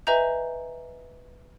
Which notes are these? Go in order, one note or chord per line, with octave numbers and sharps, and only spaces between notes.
B4 D#5 E5 G#5 A#5 G6